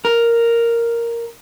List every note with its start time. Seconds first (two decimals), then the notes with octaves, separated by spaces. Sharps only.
0.05 A#4